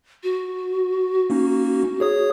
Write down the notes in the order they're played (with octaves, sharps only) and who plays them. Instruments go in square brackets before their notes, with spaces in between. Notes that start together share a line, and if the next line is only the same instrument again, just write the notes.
[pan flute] F#4
[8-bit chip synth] A#3 C#4 D#4
G#4 C#5 D#6